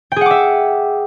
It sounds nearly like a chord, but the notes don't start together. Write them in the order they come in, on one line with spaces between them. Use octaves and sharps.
G5 G#4 F#5 D6 E5